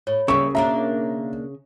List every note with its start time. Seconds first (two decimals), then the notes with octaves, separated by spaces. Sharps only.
0.07 A2 C#5
0.28 C#3 G3 A#3 E5 C#6
0.55 B2 A#3 D4 E5 A#5